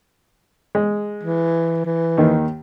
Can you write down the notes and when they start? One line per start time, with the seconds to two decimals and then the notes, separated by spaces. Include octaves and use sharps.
0.75 G#3
1.23 E3
1.85 E3
2.17 D#2 D#3